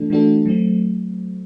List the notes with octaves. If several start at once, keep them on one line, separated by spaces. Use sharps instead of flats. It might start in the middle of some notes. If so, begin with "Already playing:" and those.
Already playing: E3 A3 D4 F#4 A4
E3 A3 D4 F#4 A4
F#3 A3 C4